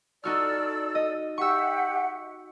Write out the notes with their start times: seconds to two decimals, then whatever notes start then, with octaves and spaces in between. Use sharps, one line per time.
0.24 D#4 F#4 A4 D5 E6 F6
0.95 D#5
1.38 G4 E5 F#5 C#6 E6